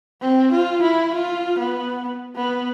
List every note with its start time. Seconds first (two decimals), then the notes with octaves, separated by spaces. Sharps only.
0.21 C4
0.52 F4
0.82 E4
1.14 F4
1.59 B3
2.36 B3